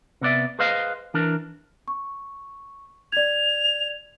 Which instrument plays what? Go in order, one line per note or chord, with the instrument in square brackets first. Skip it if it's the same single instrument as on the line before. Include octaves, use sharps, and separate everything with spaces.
[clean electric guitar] C3 B3 D5 E5
G#4 B4 C5 D#5 F5
E3 D4 A#4
[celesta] C#6
[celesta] D5 G#6 [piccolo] F7